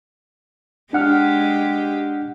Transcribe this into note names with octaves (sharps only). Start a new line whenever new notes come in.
G#3 D4 G4 F#5 F6